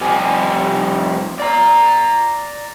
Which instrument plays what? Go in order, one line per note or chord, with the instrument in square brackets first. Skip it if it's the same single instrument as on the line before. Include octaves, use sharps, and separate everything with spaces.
[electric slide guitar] F2 G3 G4 G#5
D5 A#5